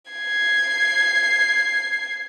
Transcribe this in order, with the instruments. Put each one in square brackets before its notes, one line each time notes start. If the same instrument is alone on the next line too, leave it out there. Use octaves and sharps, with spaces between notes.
[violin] G#6 C7